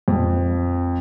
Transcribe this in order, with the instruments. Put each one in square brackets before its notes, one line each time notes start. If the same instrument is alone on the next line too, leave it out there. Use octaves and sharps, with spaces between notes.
[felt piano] F2